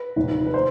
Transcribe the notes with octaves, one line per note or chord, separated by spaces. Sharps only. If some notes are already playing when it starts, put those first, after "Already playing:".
Already playing: B4
F1 D#2 D#3
B4
C5